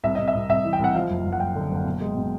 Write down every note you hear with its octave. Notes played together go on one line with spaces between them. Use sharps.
C2 E5
C3 D#5
E5
C2
C2 E5
E3
G5
C2
F#5
F3 F5
F#1
F#1
F#5
F#1 G5
D3
F#1
B2
G#3
B2